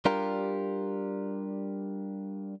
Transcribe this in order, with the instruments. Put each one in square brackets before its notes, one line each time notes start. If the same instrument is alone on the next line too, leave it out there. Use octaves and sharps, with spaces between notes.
[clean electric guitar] G3 D4 F4 G4 A#4